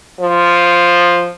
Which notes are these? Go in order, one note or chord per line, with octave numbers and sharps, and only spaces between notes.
F3